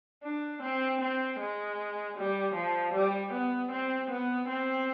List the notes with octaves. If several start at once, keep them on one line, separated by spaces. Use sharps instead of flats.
D4
C4
C4
G#3
G3
F3
G3
B3
C4
B3
C4